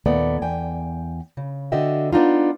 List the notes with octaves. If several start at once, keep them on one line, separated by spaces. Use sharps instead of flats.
D#2 A#2 B3 A4 D5 E5
E2 G5 G#5
C#3
D3 F#4 D#5 E5 G5
B3 D4 D#4 F4